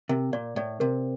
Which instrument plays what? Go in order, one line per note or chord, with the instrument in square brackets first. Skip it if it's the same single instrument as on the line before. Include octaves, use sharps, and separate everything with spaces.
[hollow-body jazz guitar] C3 [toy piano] A#4
[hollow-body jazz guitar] A#2 [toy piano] D5
[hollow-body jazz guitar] A2 [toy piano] D5
[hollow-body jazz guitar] C3 [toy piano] A#4